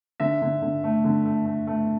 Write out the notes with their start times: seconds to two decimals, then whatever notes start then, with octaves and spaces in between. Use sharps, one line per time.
0.20 D3 E5
0.42 D3
0.62 D3
0.84 A3
1.04 D3
1.25 A3
1.45 A3
1.67 A3